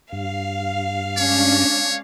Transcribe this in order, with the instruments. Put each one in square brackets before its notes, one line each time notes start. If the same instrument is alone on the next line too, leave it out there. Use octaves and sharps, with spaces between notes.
[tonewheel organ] G2 [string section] F5
[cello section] G#3 C#4 D4 [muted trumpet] C#5